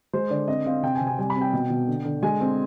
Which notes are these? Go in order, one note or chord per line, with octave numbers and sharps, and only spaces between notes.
G#3 C5
D3 D5
C4 D#5
C4 F5
C3 G5
G#5
C3
G#5
G3 G#5
B5
C4
G5
B2
B2
D3
D3
G#3 G#5
C4